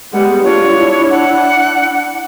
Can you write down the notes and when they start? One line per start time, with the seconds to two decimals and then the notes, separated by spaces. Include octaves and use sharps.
0.13 G3 G#3 B3 F#5
0.44 D4 F4 C#5
0.77 D4 E4
1.10 F#5